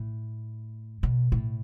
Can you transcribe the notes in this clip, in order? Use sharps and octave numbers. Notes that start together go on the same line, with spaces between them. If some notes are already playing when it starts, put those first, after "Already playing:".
Already playing: A2
B2
A2